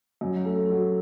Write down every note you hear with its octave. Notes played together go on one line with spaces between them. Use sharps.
F#2
A3
F#3